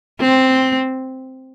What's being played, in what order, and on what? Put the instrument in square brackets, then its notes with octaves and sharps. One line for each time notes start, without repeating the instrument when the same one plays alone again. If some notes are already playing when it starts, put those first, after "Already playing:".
[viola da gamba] C4